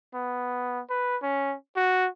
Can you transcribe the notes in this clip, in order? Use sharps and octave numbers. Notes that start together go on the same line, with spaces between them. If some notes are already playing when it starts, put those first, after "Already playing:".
B3
B4
C#4
F#4